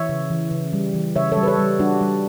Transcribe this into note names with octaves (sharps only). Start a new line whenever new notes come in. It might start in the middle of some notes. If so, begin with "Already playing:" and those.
Already playing: E3 C#5 E5
C#3
E3
C#3
G3
E3
C#3 C#5 E5
A4 C#5
G3
B4
A4 C#5
G3
G3 D4 F#4
G3